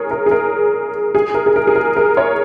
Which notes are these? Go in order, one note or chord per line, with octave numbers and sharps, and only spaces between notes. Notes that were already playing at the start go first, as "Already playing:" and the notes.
Already playing: G#4 A#4 C#5
A#4
G#4
A#4
G#4
A#4
G#4
A#4
G#4
A#4
A#4
C#5